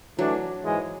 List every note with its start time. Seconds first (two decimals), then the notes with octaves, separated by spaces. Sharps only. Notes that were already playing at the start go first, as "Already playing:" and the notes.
0.18 E3 F#3 A3 D4
0.63 G#2 E3 G#3